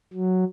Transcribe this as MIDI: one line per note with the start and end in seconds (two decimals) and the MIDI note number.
0.13 0.44 54